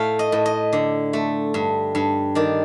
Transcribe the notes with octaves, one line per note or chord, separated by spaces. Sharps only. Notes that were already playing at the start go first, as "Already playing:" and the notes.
Already playing: A2 A3 F5 G5
D#5
A2
D#5
D3
A3
G2
G2
D#3 D5